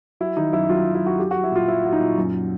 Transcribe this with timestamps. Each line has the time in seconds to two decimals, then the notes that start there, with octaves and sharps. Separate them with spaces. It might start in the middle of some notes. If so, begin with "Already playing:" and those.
0.20 F#3 E4
0.37 D#3 D#4
0.53 F#2 E4
0.69 F#3 F4
0.86 F#3
0.95 E4
1.03 F#2 F#4
1.19 F#3 G4
1.31 F#3 F#4
1.44 E4
1.52 A#2 F4
1.68 F#3 E4
1.85 F#3
1.93 D#4
2.01 A#2
2.17 F#2